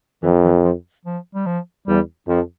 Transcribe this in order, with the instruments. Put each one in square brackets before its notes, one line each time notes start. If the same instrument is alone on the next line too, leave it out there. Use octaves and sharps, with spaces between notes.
[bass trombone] F2 [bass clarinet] E3
[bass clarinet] E3
F3
F3
G3
F3
[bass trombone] E2 [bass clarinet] G3
[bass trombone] F2 [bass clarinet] F3